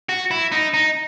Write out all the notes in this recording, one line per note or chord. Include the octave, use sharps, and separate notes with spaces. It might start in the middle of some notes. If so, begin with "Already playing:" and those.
F#4
E4
D#4
D#4